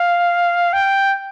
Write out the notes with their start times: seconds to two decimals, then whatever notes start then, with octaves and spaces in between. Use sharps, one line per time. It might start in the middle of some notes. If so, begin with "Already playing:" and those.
Already playing: F5
0.73 G5